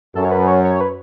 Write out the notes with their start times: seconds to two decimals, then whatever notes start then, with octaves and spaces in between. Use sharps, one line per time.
0.15 F#2 A4
0.25 C#5
0.31 B4
0.47 C#5
0.64 C#5
0.81 B4